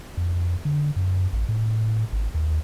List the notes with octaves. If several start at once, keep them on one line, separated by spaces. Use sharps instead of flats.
F2
D3
F#2
A1
A2
G#1
D#2